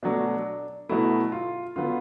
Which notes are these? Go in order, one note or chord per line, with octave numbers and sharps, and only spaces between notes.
B2 F#3 A3 D4
B2 F#3 A3 E4
F4
D3 F#3 B3 F4